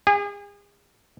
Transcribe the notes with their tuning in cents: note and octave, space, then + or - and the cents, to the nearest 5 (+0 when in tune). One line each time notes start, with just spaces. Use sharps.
G#4 -40